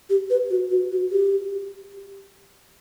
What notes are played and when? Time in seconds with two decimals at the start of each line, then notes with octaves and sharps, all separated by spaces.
0.10 G4
0.30 B4
0.50 F#4
0.71 F#4
0.92 F#4
1.11 G4